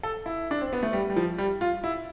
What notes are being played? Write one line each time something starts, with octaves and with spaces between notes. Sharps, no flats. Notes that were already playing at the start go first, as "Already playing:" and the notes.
A4
E4
D4
C4
B3
A3
G3
G3
F3
G3
F4
E4